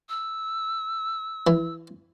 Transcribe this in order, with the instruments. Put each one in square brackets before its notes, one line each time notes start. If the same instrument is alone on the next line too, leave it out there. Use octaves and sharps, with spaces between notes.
[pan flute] E6
[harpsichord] E3